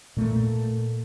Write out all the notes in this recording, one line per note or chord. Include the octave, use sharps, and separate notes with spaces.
A#2 A3